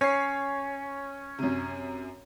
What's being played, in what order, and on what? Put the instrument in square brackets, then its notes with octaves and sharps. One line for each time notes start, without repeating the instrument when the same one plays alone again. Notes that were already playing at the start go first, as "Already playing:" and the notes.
[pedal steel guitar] C#4 [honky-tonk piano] C#5 C7
[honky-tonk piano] F#2 C3